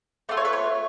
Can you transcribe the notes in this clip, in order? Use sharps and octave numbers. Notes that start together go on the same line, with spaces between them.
A3 F4 A4 D5
C#5
B4
C#5